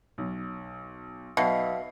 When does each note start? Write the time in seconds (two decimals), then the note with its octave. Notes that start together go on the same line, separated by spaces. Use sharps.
0.18 B1
1.37 B1 B2 E5 F5 C7